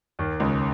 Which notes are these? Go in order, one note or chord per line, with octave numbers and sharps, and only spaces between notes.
D#2 D#3
C#2 C#3